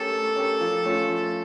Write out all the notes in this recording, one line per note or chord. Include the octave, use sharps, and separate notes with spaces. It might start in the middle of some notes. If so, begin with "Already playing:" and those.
Already playing: A3 C#4 G4 A4 A#4
A3
C#4 G4 A#4
F3
A3 C#4 F4
F3